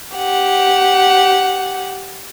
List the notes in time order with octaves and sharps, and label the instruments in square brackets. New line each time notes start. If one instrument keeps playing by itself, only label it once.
[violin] G4 F#5